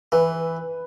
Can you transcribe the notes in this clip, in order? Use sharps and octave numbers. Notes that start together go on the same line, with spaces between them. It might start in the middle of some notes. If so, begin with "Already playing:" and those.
E3 B4